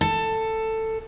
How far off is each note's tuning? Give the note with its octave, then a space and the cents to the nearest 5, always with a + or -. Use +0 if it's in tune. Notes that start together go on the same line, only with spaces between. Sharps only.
A4 +15